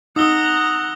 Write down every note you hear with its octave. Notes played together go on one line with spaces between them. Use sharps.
D#4 F#5 A#5 D#6 E6 G7